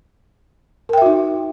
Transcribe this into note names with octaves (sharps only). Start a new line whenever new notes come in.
D#4 F#4 A#4 E5 G5